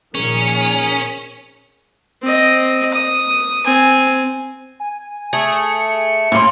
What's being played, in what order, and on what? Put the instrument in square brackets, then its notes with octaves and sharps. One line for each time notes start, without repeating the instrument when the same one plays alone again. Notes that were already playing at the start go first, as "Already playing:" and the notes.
[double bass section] A#2 D#3 F3 [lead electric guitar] C#4 [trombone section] G#4 A#4
[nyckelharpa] C4 D#5
D#6
C4 G#5
[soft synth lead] G#5
[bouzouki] A3 G#4 [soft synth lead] C#7
[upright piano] A2 C6 [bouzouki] A#3